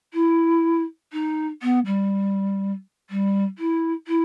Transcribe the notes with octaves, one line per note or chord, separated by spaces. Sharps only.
E4
D#4
B3
G3
G3
E4
E4